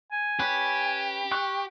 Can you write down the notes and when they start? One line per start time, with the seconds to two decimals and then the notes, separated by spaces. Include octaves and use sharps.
0.12 G#5
0.40 C#4 G4 B4
1.31 G5 C#6 F#6